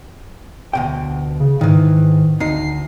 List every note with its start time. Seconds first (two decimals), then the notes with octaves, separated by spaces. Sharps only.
0.73 D2 B2 G5
1.40 C#3
1.61 G#2 D#3 E3
2.40 D2 D#4 C7